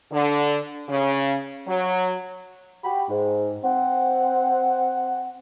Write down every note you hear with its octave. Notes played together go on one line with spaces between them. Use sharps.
D3
C#3
F#3
F#4 G4 G5 B5
G#2
C4 F#5